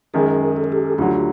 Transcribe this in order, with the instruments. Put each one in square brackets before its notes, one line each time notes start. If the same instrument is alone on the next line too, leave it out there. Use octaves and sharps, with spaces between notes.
[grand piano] F#2 D#3 G#3 [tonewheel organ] G#4 A#4
[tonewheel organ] A4
A#4
G4 A4
[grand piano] D2 D3 F#3 [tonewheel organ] F4 G4